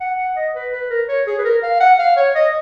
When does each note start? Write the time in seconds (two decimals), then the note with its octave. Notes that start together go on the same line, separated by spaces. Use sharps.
0.01 F#5
0.18 F#5
0.36 D#5
0.55 B4
0.73 B4
0.90 A#4
1.09 C#5
1.27 G#4
1.39 B4
1.44 A#4
1.63 F5
1.80 F#5
1.99 F5
2.16 C#5
2.35 D#5